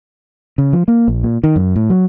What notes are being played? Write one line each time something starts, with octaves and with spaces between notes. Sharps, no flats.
C#3
F3
A#3
A#1
A#2
D#3
F#2
A2
F#3